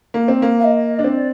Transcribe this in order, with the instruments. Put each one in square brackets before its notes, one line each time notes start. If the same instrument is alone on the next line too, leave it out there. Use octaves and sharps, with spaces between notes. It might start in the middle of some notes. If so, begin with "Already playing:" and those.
[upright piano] A#3
C4
A#3
[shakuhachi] F5
D#5
[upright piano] D4
[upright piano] C4 [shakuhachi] D5